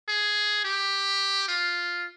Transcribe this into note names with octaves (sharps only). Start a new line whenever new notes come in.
G#4
G4
F4